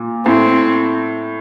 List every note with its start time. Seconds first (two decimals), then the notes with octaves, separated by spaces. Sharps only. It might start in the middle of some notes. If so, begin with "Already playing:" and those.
Already playing: A#2
0.26 A2 C4